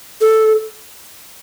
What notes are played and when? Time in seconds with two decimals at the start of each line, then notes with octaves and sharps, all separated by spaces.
0.21 A4